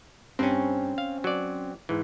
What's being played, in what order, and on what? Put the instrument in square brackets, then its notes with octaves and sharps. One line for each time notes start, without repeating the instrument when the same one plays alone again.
[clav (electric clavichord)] G2 [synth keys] C4 C#4
[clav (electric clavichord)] F5
F#3 D5
G#2 E3